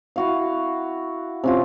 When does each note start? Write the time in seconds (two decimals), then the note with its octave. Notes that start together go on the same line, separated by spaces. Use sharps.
0.16 E4 F#4 F5
1.44 C3 C#4 F4